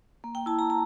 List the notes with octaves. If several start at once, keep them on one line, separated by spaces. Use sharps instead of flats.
A#3
G5
E4 A5
A#5
A#5